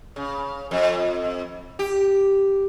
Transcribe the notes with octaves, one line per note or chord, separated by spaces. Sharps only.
C#3
F2
G4